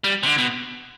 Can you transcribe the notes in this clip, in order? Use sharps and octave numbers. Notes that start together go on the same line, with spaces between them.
G3
C3
D3
B2